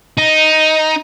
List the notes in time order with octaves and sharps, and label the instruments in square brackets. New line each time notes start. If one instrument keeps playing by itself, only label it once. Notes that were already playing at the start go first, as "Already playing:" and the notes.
[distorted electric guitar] D#4